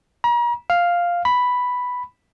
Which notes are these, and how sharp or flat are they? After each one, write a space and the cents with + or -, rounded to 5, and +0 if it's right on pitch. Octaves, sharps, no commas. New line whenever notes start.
A#5 +40
F5 +0
B5 +0